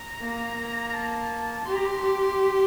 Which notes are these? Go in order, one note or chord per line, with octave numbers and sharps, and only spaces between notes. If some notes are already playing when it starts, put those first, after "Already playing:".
Already playing: A#5
A#3
A#3
A#5
A5
G4 C6
A#5
C6
G4